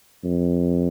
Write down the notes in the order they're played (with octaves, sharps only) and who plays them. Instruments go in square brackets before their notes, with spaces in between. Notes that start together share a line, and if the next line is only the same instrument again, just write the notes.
[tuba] F2